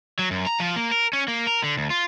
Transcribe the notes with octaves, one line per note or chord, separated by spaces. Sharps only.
F#3
F#2
A#5
F3
A#3
A#4
C#4
A#3
A#4
D3
D2
F4